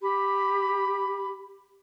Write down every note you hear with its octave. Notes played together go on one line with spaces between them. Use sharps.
G4 B5